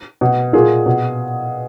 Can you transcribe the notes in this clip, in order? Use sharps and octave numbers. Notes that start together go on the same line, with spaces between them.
B2
A#2 G#4
B2